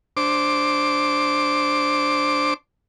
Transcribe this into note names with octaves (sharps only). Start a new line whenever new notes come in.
D4 C5 D6